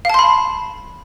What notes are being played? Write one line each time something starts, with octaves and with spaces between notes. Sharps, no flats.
F5 A5 B5 C6